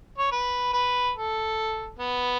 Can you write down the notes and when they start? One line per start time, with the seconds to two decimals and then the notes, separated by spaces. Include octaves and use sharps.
0.18 C#5
0.32 B4
0.73 B4
1.16 A4
1.98 B3